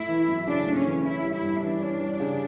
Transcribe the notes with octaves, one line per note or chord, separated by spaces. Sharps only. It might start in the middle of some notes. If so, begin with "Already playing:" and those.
Already playing: A3 E4
E3
F#2
C#3 D4
A3
C#4
E3
C#4 E4
G3
E4
G2
E3 D4
C#4
G3
C#3